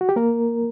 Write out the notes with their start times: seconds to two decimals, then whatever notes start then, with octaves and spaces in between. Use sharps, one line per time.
0.01 F#4
0.09 G4
0.16 A#3 A#4